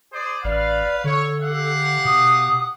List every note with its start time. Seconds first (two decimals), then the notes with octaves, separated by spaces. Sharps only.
0.13 G#4 C5 D5
0.44 A1 B4 D5 F5
1.04 D3 A4 C#5
1.41 G4 F5 F#5
2.05 B2 D#6